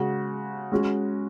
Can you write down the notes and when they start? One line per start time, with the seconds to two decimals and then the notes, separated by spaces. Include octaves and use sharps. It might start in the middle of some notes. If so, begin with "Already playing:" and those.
Already playing: C#3 G#3 F#4
0.72 G#3 C#4 F#4